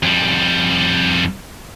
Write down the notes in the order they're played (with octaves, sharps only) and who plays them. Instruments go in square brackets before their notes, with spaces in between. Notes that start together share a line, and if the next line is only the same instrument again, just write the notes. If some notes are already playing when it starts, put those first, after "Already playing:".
[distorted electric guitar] F2 G3